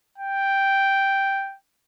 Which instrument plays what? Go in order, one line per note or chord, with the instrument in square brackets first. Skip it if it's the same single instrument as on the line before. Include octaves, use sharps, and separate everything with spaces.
[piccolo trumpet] G5